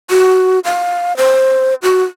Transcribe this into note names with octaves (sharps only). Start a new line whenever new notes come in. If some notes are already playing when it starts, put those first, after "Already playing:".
F#4
F5
C5
F#4